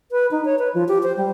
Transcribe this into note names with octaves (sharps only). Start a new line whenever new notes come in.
B4
D#4
C#5
B4
F3
G4
C5
G3